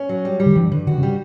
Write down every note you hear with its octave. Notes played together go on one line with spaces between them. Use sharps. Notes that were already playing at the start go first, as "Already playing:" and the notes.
Already playing: C#4
F#3
G3
G3
D3
G2 E3
G2 D3
D3 F#4
C#3
G3